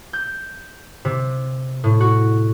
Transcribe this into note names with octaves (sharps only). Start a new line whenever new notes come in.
G6
C3
A2
F#4